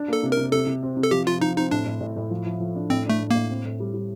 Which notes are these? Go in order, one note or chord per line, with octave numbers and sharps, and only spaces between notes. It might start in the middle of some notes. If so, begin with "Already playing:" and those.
Already playing: D4
A#3 A4
C3
A#4
C3
C3 A4
C3
C4
C3
A4
F3 G4
F3 F4
F3 D#4
C4 D#4
A2 D4
A2
A2
A2
F3
F3
F3
D4
A2 C4
A3 D4
A2
A2 A#3
C4
A2
G3
G3